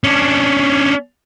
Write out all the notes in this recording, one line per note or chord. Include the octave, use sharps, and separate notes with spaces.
C#4 D4